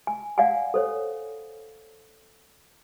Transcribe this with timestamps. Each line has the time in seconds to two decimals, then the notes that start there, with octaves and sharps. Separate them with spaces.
0.07 G#5
0.38 D5 F5 F#5 G#5
0.74 A4 C5 C#5